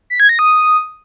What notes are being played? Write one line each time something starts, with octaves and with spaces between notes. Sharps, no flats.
B6
G#6
A#6
D#6